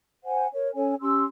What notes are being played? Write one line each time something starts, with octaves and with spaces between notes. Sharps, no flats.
C5 F#5 G#5
A#4 C#5
C#4 A4 C#5 G#5
C#4 G4 C6 E6